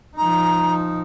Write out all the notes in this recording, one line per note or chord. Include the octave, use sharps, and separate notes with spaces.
F3 D#4 A#5